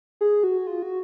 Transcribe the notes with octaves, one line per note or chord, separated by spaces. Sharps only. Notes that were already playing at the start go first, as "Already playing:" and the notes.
G#4
F#4
F4
F#4